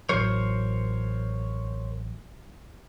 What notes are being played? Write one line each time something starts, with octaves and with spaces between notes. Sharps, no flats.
A1 F#3 A#4 C5 C#5